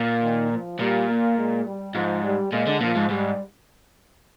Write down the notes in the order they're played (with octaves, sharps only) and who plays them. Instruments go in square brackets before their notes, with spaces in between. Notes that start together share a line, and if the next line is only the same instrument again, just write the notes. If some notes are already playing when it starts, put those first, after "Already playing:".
Already playing: [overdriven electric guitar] A#2
[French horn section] D#3
F3
[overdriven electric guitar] A#2 [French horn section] G3
[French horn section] A#3
G#3
G3
[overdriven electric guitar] G#2 [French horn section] F3
[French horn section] G3
[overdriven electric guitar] A#2 [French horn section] G#3
[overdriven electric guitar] D3
[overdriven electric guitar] A#2 [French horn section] F3
[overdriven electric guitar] G#2
[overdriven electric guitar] G#2 [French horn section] G3